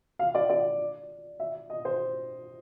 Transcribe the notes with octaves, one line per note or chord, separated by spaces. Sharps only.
F5
D5
D5
E5
D#5
C5